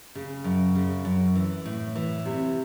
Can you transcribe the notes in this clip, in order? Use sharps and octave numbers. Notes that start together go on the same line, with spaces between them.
C#3
F#2
C#3
F#2
E3
A2
E3
C3